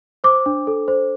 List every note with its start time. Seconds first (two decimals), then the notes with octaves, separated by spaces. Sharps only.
0.24 C5 D6
0.46 D4
0.67 A4
0.88 C5